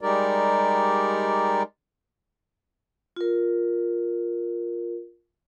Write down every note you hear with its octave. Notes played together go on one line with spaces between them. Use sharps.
G3 G#3 D#4 G4 A#4 D5
F4 A#4